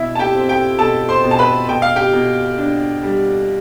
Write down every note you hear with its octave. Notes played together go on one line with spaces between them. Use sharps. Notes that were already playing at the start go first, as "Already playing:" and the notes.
Already playing: B2 E4 E5
A5
G4 G5
C4
G4 G5
B2 A4 A5
C5 C6
B2
A5
B4 B5
B2 G5
F5
G4 G5
B2
D4
G3